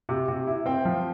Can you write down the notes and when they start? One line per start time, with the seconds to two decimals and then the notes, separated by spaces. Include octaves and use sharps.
0.09 C3
0.28 C3
0.47 E4
0.66 C4 G5
0.85 F3